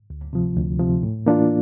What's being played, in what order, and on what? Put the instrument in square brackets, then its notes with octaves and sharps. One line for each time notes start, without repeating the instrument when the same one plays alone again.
[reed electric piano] D2
C3 F3
D2
C3 F3
A2
E3 A#3 D4 F4